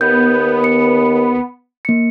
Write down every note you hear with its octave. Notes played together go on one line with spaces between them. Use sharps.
D#2 B3 G6
C#7
A#3 C#7